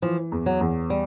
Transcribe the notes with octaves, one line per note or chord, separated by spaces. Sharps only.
E3 F3
E2
F#3
E2
G3